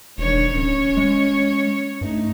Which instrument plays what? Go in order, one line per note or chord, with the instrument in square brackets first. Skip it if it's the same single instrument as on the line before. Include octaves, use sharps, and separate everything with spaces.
[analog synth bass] E1 [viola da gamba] D#3 D4 C#5
[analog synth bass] D1 [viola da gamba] C#4 C#5
[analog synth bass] G#3
[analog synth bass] G2 [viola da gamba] A3 D#4